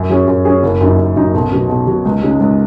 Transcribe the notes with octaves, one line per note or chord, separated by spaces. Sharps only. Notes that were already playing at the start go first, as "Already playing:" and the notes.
Already playing: F#2
F#3 C#4 G#4
F#2
F#3 C#4 G#4
F#1
F#2 F#3 D#4
F#1
F#2 F#3 D#4
B1
B2 F#3
B1
B2 F#3
C#2
C#3 G#3 D#4
C#2